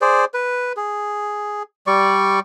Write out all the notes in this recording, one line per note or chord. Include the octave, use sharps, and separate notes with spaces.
G#4 C5 D5
B4
G#4
G3 D5 C#6